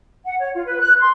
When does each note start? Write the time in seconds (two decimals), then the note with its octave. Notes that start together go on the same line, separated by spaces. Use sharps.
0.24 F#5
0.39 C#5
0.54 F4
0.65 B4
0.79 F#6
0.99 C6